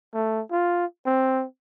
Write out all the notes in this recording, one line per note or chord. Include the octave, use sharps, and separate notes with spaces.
A3
F4
C4